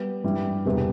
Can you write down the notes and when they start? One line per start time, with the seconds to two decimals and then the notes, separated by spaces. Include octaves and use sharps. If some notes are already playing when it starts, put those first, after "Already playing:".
Already playing: G3 B3
0.24 G2 E3 G3
0.65 E1 E2 C3 G3 B3